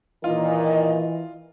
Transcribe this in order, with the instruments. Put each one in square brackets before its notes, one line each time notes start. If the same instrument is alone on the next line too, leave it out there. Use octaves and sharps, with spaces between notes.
[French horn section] A#2 D#3 [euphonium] E3 [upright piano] F4 [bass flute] D#5